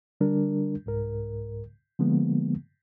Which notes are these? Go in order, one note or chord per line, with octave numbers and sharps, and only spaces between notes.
D3 G3 D4 A#4
C2 G#2 A#4
D3 F3 G#3 A#3 B3